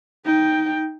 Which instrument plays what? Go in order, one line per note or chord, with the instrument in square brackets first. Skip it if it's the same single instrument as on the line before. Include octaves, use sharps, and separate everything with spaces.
[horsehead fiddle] D#4 G5